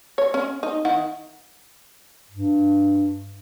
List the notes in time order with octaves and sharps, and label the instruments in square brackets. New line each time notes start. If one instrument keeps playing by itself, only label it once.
[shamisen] C#5
C#4
D#4
D#3 E4 F#5
[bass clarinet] G2